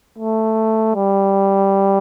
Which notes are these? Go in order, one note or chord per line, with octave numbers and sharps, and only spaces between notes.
A3
G3